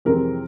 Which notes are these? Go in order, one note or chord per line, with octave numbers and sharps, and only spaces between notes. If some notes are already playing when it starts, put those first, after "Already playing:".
F2 C3 E3 G#3 C4 A#4